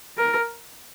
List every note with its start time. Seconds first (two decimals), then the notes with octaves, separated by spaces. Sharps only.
0.18 A#4